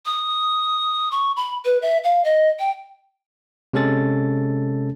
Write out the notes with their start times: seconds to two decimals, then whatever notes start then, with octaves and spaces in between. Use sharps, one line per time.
0.06 D#6
1.12 C#6
1.37 B5
1.65 B4
1.82 E5
2.04 F5
2.25 D#5
2.60 G5
3.73 C3 G#3 C#4 A4 A6